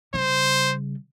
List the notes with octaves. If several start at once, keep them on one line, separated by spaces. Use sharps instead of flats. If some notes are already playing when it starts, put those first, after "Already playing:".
C#3 G3 C5